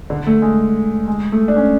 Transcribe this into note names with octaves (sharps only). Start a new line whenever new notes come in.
D3
A3
G#3
G#3
A3
D4
C#4